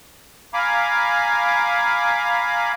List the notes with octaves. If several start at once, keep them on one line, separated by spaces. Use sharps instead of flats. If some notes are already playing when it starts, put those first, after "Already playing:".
F5 G#5 A#5 B5 D6